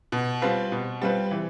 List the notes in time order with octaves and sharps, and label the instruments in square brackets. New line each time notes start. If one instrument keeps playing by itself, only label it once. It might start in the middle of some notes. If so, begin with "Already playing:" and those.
[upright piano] B2
G3 C4 F4 B4
B2
G3 C4 F4 B4
E3